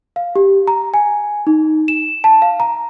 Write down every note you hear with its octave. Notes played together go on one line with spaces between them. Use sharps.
F5
G4
A#5
G#5
D#4
E7
A5
F5
A#5